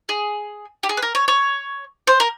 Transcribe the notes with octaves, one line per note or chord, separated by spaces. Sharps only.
G#4
G4
G#4
B4
A#4
C#5
C#5
C5
A#4